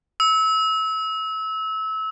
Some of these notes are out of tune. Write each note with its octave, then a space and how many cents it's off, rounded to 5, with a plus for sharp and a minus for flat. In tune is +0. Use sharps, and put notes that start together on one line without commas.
E6 -25